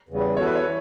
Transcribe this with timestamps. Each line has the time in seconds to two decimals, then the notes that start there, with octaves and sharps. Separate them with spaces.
0.09 E2 C#3 G3
0.37 E3 B3 F#4 A4 C#5
0.46 B4
0.55 C#5
0.65 E3